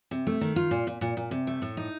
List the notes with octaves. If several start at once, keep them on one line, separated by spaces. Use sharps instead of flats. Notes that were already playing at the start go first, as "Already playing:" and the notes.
C3
A3
D#3
F4
A#2
A#2
A#2
A#2
C3
A3
A2
D#4